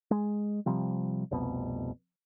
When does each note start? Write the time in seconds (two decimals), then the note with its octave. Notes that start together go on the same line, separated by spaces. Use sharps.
0.11 G#3
0.66 C3 F3 G3
1.31 F1 C2 B2